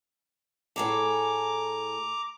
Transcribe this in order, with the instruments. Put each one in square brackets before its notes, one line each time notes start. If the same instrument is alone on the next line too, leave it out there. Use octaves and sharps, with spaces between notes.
[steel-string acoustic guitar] A2 G#4 A4 [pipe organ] A#5 D6